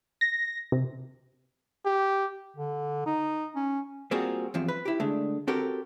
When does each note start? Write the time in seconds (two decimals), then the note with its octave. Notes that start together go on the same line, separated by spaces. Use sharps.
0.21 A#6
0.72 C3
1.86 G4
2.56 D3
3.06 D#4
3.55 C#4
4.11 G3 A#3 C4 F4 F#4 G#4
4.54 E2 G2 F3 C4
4.68 B4
4.85 E4 G4
5.00 D3 G#3 A3 D4
5.47 C4 F#4 G4 A4 A#4